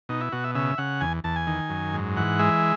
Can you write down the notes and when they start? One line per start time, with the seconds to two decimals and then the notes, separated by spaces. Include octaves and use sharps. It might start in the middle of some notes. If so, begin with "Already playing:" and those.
0.09 B2 D#4
0.21 E4
0.32 B2 F#4
0.44 E5
0.55 C#3 E5
0.78 C#3 F#5
1.01 E2 G#5
1.24 E2 A5
1.36 G#5
1.47 D#3
1.70 F#2
1.94 G#2
2.17 E3 F#5
2.39 G#3 E5